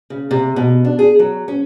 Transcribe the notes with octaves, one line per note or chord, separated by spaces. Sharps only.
C#3
C3
B2
D4
G#4
F#3
C#4